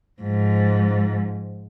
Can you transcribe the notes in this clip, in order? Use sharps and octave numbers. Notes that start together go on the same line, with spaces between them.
G#2 F3